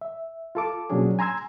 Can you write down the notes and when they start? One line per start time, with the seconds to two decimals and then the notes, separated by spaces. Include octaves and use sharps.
0.01 E5
0.55 F4 A4 D6
0.90 B2 F#3 A#3 C#4 D4 G#4
1.19 G#5 A#5 C6 E6 G#6